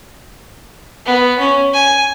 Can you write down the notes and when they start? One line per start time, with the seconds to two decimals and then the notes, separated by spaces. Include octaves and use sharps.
1.06 B3
1.39 C#4
1.74 G#5